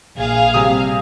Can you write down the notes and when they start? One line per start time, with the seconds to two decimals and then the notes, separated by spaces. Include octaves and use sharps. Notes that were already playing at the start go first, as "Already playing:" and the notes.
0.16 A#1 G#4 F5
0.54 C3 G3 D#6